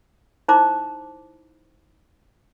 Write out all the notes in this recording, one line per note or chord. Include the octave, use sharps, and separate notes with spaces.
D#4 E4 C5 A#5 D6